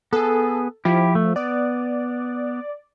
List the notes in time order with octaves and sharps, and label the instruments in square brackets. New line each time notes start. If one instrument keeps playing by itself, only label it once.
[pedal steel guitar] B3 G#4 [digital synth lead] A4
[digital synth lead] F3 [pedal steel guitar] E4 G4
[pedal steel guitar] A3
[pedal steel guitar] B3 [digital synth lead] D5